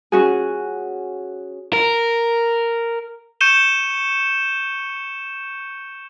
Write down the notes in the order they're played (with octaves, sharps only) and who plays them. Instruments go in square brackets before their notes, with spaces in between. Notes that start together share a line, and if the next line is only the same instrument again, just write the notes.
[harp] C#4 F#4 G#4
[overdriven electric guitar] A#4
[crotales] C#6 G6 C#7 D#7 E7 G7